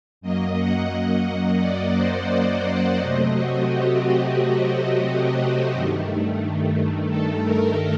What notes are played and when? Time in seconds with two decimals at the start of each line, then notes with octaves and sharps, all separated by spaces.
0.21 F#2 F#3 A#3 D#5
0.57 F#5
0.90 F#5
1.25 D#5
1.59 D5
1.94 C5
2.28 D5
2.63 F#5
2.97 C3 F#3 A3 C4 D#5
3.32 F#4
3.66 G4
5.04 F#4
5.73 G2 D#3 A3
7.11 A4
7.45 A#4